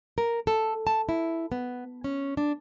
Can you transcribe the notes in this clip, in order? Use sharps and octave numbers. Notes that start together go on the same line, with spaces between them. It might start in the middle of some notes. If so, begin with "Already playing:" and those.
A#4
A4
A5
E4
B3
C#4
D4